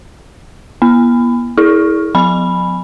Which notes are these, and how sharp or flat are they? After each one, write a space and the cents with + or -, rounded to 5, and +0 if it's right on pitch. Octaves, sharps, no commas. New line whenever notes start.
B3 -45 B5 +25
E4 -20 G#4 +0
F3 +45 G#5 +0 B5 -5